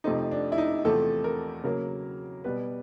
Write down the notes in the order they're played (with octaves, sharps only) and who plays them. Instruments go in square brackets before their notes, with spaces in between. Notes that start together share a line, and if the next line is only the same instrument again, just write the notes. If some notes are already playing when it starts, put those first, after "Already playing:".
[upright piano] F2 C3 F3 A3 C4 D#4
D4
E4
D#4
E2 C3 F3 A3 C4 A4
A#4
C#3 F#3 A#3 A#4
B2 G3 B3 B4